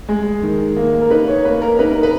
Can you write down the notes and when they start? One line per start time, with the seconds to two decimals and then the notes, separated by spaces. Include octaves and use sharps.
0.09 G#3
0.43 D#3
0.77 A#3
1.02 A#4
1.10 D#4 B4
1.28 C#5
1.45 A#3 B4
1.62 A#4
1.79 D#4 B4
1.91 A#4
2.03 B4